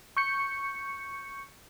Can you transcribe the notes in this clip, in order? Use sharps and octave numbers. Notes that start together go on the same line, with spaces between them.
C#6 G6 C#7